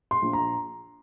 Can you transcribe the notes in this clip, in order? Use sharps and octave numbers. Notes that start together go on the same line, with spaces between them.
C6
A#1
A#5